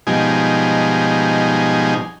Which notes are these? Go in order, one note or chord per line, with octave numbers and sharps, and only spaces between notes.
G#2 B2 F3 G3 D#4 G#5